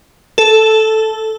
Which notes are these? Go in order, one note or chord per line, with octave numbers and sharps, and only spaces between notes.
A4